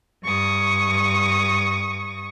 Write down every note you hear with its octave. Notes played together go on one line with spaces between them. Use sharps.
G2 C#6 D#6